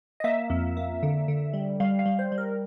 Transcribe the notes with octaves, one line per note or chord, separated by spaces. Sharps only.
D#5
A#3 E5
F2
A#3
D3
D3
G3
G3 F5
F5
G3
C5
G3
A#4